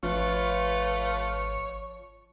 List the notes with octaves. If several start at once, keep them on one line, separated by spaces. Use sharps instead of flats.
G#1 F3 A3 F4 B4 C#5